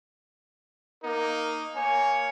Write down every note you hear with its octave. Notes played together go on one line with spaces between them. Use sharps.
A#3 D#4 A#4
A#3 C#5 G#5